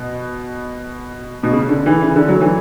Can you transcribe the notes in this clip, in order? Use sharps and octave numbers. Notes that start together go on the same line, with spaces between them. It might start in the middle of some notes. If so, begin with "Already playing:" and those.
Already playing: B2
B2
C#3
D3
E3
C#3
D3
F#3
E3